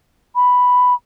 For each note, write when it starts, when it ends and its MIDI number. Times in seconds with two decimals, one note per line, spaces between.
0.35 0.93 83